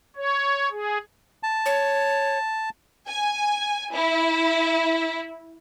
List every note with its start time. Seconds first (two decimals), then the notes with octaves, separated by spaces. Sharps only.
0.16 C#5
0.71 G#4
1.43 A5
1.66 C#5
3.08 G#5
3.94 E4